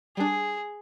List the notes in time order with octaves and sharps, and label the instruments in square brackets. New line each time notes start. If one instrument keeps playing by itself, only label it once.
[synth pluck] G3 D4 [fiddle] G#4